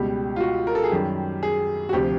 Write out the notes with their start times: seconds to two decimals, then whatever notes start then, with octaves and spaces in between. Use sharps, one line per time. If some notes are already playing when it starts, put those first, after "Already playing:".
Already playing: C#2 B2 G3 G4
0.36 F4
0.40 F#4
0.67 A#4
0.75 A4
0.84 G#4
0.92 F#2 D#3 G3 G4
1.43 G#4
1.89 F#4
1.93 D2 C3 F3 G4